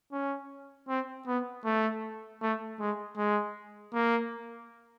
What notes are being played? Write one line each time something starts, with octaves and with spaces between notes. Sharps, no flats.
C#4
C4
B3
A3
A3
G#3
G#3
A#3